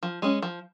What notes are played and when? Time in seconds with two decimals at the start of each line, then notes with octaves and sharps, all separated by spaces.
0.03 F3
0.22 G#3 C#4
0.42 F3